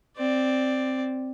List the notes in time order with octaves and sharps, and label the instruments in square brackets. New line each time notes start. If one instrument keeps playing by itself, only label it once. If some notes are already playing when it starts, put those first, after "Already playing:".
[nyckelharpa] C4 D5